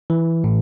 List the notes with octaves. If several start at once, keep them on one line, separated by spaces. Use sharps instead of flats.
E3
A2